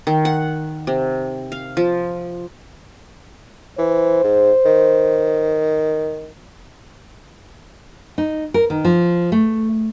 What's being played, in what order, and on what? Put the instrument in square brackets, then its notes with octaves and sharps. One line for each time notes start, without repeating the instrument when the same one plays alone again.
[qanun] D#3
F#5
C3
F5
F3
[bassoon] E3 [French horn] C5
[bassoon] G#2
D#3
[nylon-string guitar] D#4
A#4
D#3
F3
A3